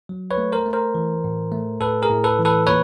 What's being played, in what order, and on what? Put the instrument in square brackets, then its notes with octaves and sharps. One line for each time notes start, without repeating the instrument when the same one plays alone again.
[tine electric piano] F#3
B4 C#5
A3
A#4 C5
A3
A#4 C5
E3
A2
A3
A2 A4 B4
G#4 A#4
A2
A4 B4
E3
A4 B4
A#2 B4 C#5